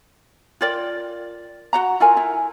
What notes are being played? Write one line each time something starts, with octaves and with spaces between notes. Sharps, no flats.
F4 A#4 D5 G5
F#4 F#5 A#5
E4 F4 A#4 G#5
E4